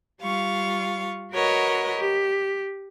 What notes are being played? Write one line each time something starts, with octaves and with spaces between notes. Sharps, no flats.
G3 F4 F5 C#6
F#4 A#4 B4 C#5 D#5 F#5
G4